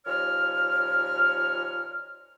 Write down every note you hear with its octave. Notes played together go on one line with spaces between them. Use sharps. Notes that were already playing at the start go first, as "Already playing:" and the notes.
D#2 A#2 F3 C#5 F6